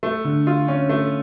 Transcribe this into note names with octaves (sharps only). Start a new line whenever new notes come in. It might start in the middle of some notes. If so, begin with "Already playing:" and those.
A3
D3
F4
C#4
A3